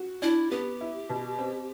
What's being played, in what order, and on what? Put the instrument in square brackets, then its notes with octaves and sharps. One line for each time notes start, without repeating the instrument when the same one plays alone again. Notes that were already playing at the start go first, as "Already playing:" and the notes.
Already playing: [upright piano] F#4
[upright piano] D4 [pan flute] E4
[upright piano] B3 [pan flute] G4
[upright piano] E4
B2
C4